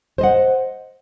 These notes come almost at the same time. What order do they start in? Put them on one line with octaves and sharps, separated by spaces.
C5 D#5 F#5